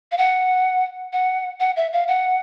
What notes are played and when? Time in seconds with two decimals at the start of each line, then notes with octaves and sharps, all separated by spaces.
0.12 F5
0.18 F#5
1.13 F#5
1.60 F#5
1.76 E5
1.93 F5
2.08 F#5